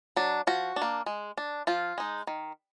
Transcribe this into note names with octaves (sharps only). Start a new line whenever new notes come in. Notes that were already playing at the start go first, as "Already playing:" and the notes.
F#3 D4
F3 F#4
D4
A#3
G#3
D4
F3 F4
G#3 D#4
D#3